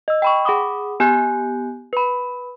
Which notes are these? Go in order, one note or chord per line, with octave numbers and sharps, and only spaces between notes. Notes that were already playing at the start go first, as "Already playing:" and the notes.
D#5 E6
G5 B5 C#6
G#4 F#5 B5 D6 D#6
B3 G4 G#5 F#6 G6
B4 B5